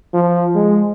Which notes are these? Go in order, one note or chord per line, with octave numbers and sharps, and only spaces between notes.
F3
G#3